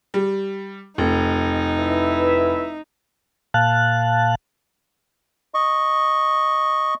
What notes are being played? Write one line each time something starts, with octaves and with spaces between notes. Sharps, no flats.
G3
F1 D#4
E4 B4 E5
A#2 F5 A5 F#6
D#5 C#6